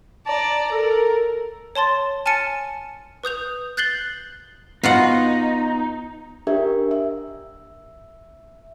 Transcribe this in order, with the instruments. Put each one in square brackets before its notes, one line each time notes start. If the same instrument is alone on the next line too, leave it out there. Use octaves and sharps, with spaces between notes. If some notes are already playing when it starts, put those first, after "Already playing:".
[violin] D5 A#5 [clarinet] A5
[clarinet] A4 [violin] A#4
[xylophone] C#5 A5 C6 A6
G#5 A5 F6 A6 C#7 D#7
B4 D#6 G6 F7
F#6 G6 A6 C7 F#7 G7
[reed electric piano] B3 [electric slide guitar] D#4 [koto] F4 F#4 F#5
[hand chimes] D4 G4 A#4 E5
E5